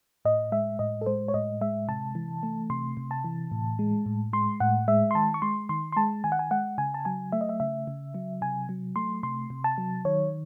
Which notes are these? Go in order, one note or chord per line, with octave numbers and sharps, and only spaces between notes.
A2 D#5
G#3 E5
A2 D#5
A4
G#3 C5
C#5
A2 D#5
G#3 E5
C3 A5
E3
A3
C3 C6
C3
A5
E3
A2
G#3
A2
G#3 C6
A2 F#5
G#3 E5
C6
D#3 A5
C#6
G#3 C6
D#3 C6
C6
G#3 A5
D#3 G#5
F#5
G#5
G#3 F#5
C#3 G#5
A5
F#3 G#5
A3 E5
D#5
E5
C#3 E5
C#3
F#3
C3 G#5
F#3
A3 C6
C3 C6
C3
A5
F#3
D#3 C#5